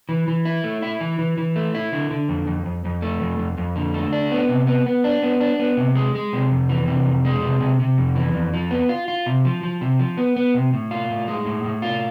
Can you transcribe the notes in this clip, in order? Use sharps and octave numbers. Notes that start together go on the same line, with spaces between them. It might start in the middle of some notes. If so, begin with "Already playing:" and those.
E3
E3
E4
A3
E4
E3
E3
E3
A3
E4
D3
D3
F2
F2
F2
F2
A3
F2
F2
F2
D3
A3
D4
B3
C3
B3
B3
D4
B3
D4
B3
C3
G#3
G#3
C3
F2
E3
C3
F2
G#3
C3
C3
C3
F2
E3
F2
F3
B3
F4
F4
C3
F3
F3
C3
F3
B3
B3
C3
A2
F4
A2
G#3
A2
A2
F4